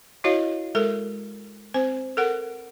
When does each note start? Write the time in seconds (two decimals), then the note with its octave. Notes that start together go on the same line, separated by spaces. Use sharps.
0.24 E4 F#4 C#5 D#5 F5
0.75 G#3 A4 A#4
1.74 C4 C5
2.17 A4 A#4 F#5